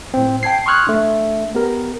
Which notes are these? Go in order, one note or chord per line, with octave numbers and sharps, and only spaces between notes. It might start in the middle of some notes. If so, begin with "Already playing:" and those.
A2 C4
G5 A5 G#6 C7
C6 C#6 D#6 F6 F#6 G#6
A3 D4
B3 G4 A#4